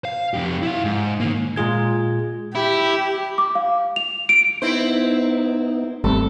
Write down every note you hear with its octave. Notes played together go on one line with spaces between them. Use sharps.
F5
F2 G4
E4 F5
G#2
D#3 A#3
A#2 G#3 F4 G#4 G#6
E4 G4
D6
F5
F7
D7
B3 C4 D#4 E4 C5
G#1 G3 A3 C4 A4